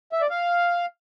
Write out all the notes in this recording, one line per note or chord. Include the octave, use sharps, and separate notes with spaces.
E5
D5
F5